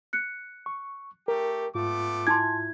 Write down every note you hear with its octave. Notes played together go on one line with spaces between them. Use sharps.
F#6 C#7
C#6
A3 G4 A#4
G#2 A3 B3 F4 D6
E4 G#5 A5 C6 G#6